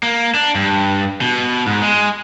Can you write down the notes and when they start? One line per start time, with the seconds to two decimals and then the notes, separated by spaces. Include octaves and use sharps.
0.03 A#3
0.35 D4
0.55 G2
1.21 B2
1.66 G#2
1.82 G#3